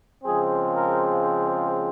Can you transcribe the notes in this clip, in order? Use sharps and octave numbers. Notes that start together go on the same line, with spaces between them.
C#3 F3 G#3 C4 G#4
A#4